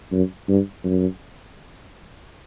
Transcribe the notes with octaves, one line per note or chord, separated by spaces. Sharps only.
F#2
G2
F#2